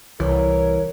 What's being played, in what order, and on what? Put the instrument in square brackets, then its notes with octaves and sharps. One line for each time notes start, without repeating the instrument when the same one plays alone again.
[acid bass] C2 [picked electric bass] E3 [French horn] A#4 [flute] C#5